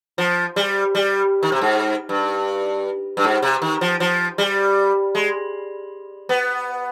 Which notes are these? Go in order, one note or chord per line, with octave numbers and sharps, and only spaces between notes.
F3
G3
G3
D#3
C3
G#2
G2
G2
G#2
C3
D#3
F3
F3
G3
G#3
B3